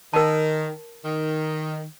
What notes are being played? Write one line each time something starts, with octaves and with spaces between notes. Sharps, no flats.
D#3 A#4 A5
D#3